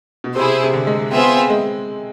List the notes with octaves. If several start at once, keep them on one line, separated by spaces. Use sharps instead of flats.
B2
C3 E4 G#4 C5
C3
D3
G#3
B3 C4 F4 G#4 C5 E5
C4
G#3